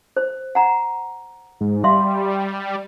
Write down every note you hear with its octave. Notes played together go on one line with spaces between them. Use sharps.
C5
F#5 A#5
G#2
G3 E5 F5 C6